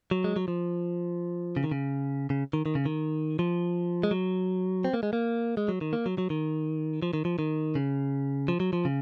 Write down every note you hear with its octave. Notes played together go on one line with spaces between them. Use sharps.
F#3
G#3
F#3
F3
C#3
D#3
C#3
C#3
D#3
D#3
C#3
D#3
F3
G#3
F#3
C4
A#3
G#3
A#3
G#3
F#3
D#3
A#3
F#3
F#3
D#3
F3
D#3
F3
D#3
C#3
F3
F#3
F3
C#3